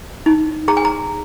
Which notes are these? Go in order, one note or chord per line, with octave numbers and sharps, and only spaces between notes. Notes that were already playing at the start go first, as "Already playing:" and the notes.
D#4
G#4 A#5
G#5
A#5